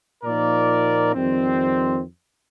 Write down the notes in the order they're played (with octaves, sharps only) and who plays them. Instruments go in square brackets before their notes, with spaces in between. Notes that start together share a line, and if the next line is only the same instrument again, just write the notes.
[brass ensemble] A#2 F3 A#3 D#4 A#4 D5
F2 D#3 G3 C4